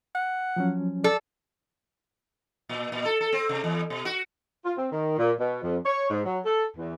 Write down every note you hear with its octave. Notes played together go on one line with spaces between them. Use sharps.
F#5
F3 F#3 C#4
A4 D5
A#2
A#2
A4
A4
C4
C3
E2
B2
F#4
F4
C4
D#3
A#2
B2
F2
C#5
G#2
F#3
A4
E2